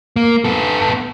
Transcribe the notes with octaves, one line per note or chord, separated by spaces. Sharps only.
A#3
B3 A4